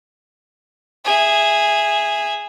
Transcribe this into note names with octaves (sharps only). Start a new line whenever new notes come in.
G#4 E5